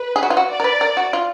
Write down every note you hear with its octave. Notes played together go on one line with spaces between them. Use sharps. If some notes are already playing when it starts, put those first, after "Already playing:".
Already playing: B4
G#4
F#4
F4
F#4
D5
A#4
B4
A#4
F#4
F4